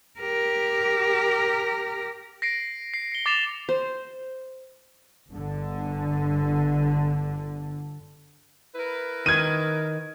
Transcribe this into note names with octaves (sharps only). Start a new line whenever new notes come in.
G4 A#4
A#6 C7 D7
C7
C#7 G7
D6 A6 C7 E7 F7
C5
G1 D3
E4 A#4 B4
D#3 G#6 D#7